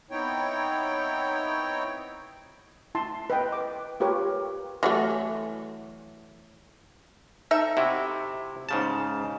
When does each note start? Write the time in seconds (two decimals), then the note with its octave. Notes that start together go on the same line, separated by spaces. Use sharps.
0.11 B3 C4 D#4 E4 C#5 G5
2.95 E4 A5 C6
3.30 B4 D#5 G5
3.53 D6
4.00 F4 G4 A#4 B4 C#5
4.83 E3 F#3 A3
7.51 D#4 A4 E5
7.77 C3 E4 F#4
8.69 G#2 C#3 A5